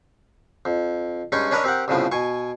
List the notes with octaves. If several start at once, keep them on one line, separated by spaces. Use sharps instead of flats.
F2
G2 G#3 C#4 D#4 C#6
C#4 D4 A#4 B4 C#5 D#5
C4 G4 A#4 F#5
C2 A2 C#3 F3 B3
B2 G#5 C#6